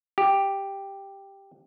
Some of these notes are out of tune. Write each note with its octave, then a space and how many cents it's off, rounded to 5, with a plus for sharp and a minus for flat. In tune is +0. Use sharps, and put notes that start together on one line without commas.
G4 +5